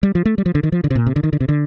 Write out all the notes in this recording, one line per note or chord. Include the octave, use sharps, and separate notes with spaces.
G3
F3
A3
G3
F3
D3
D#3
F3
D3
C3
A#2
C3
D3
D#3
D3
C3
D3